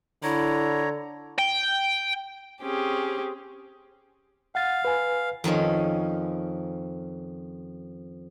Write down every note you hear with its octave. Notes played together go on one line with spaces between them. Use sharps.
D3 E4 C#5 A#5
G5
C4 C#4 G4 G#4
F5 F#5 A6
B4 G#5
F2 D#3 F3 C#4